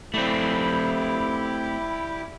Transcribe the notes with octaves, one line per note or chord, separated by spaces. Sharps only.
G3 A3 C4 E4 G4